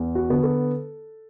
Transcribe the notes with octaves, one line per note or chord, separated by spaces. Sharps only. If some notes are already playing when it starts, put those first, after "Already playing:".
Already playing: E2
F#4
D3 B3
A4